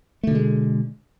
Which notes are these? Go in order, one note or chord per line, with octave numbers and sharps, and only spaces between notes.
B2 D3 G#3 A3